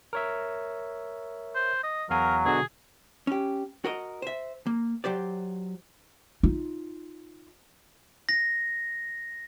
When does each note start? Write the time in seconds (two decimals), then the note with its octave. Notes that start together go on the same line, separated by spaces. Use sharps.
0.13 A#4 C#5 E5
1.55 C5
1.83 D#5
2.10 E2 F#3 A#4 F5 G#5
2.45 B2 D3 F#4 G#4
3.27 C#4 G4
3.85 F#4 A#4 D#5
4.22 C5 E5
4.67 A#3
5.04 F#3 G4 C5 D5
6.43 D#4 F4
8.29 A#6